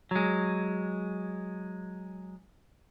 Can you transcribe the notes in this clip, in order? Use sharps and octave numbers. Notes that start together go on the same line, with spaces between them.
F#3 G#3